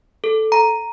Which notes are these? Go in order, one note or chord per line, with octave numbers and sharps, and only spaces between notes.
A4
A#5